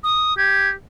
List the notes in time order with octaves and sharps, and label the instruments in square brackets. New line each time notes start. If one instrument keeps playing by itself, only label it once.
[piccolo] D#6
[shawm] G4 [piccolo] G#6